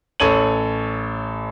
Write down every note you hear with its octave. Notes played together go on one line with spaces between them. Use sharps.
A1 A4 C#5 D#7 F#7